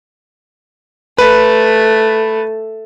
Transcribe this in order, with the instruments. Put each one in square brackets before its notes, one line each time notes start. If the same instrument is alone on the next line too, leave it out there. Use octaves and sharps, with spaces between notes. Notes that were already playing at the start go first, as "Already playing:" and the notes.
[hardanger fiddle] A3 [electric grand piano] B4